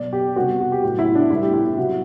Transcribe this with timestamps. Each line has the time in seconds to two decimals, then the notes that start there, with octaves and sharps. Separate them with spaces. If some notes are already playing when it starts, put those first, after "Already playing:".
Already playing: B2 F#3 B3 D5
0.13 G4
0.36 C3 G3 B3 F#4
0.60 F#4
0.72 G4
0.84 A2 F#3 B3 F#4
0.99 E4
1.15 D4
1.30 A2 G3 B3 E4
1.43 G4
1.54 E4
1.66 E4
1.77 C3 F#3 B3 F#4